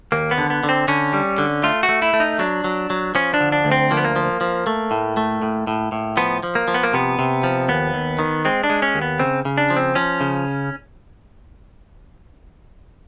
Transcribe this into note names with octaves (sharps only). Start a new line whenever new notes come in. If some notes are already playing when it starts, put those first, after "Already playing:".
D#2 A#3
B3
D3
B3
D3
C4
D3 C#4
G3
D3
A3 F4
F#4
A3
E4
A3
D#4
F#3 D4
F#3
F#3
F3 C#4
D4
D3
D4
D2
C4
F3 A#3
B3
A#3
F3
F3
A3
A2
A3
A2
A2
A2
F3 B3
F3
A#3
F3
B3
A#3
C3 B3
C3
F3
D#2 B3
D#2
D#3
G#3 C4
D4
G#3
C#4
D#2
B3
C#3 C4
C#3
D4
F3
C4
F3 C#4
C#3